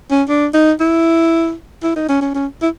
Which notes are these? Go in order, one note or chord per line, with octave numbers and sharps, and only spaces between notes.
C#4
D4
D#4
E4
E4
D#4
C#4
C#4
C#4
E4